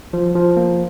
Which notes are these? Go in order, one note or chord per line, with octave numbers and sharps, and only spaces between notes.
F3
F3
A#3